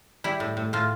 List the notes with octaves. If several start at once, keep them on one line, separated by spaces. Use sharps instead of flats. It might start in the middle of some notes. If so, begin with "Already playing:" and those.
G3 E4
A2
A2
A2 F4